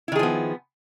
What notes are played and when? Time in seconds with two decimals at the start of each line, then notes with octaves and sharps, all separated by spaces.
0.08 E4
0.12 D#3
0.16 G#4
0.19 F3
0.23 B3